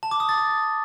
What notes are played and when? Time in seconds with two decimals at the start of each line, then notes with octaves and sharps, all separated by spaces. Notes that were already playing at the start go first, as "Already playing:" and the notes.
0.03 A5
0.11 D6
0.20 D#6
0.29 A6